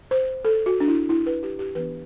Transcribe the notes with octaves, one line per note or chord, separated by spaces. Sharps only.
C5
A4
F#4
D4
E4
E4
B4
G4
G4
E3 B3 D4 B4